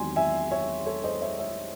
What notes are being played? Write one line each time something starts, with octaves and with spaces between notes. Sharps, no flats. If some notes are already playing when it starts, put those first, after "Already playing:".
Already playing: E2 D#3 F#3 C4 G#5 C6
E5 G#5
C#5 E5
A4 C#5
C5 D#5
C#5 E5
C#5 E5